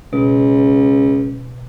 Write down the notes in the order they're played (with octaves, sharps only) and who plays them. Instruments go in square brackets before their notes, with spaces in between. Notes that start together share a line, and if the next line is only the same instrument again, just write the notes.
[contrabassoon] C#2 [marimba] B2